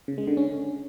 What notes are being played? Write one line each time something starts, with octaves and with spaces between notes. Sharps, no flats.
C#3
G#3
D3
C#4